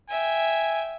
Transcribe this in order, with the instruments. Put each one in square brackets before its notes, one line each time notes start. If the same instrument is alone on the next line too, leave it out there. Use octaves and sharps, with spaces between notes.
[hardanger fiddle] E5 G5 [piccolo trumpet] G#5